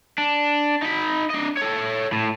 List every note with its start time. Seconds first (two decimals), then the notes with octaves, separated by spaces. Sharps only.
0.18 D4
0.83 D#4 B5
1.31 D4 D#5
1.57 A4 C#5
2.12 A2